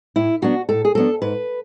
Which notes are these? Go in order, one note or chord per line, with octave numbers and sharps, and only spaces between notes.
A2 E4
F#3 B3 D4 F#4
A2 A4
G#4
F#3 B3 D4 A4
G#2 B4